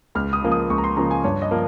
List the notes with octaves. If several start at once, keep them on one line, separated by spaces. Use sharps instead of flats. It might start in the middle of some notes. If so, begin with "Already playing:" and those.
C#2 F6
D#6
C#3 F3 A#3
D#6
C#2 C#6
A#5
C6
C#3 F3 A#3 A#5
G#5
G2 C#5
D#5
F3 A#3